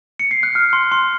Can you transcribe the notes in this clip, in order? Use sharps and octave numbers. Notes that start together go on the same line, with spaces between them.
C#7
C7
F#6
F6
C6
C6